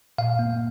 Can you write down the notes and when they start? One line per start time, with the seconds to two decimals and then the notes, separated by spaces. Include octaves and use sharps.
0.18 A#2 F5
0.39 A#3